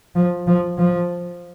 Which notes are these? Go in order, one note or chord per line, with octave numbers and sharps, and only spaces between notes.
F3
F3
F3